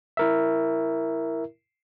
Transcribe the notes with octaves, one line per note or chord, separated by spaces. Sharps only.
E4 A#4 E5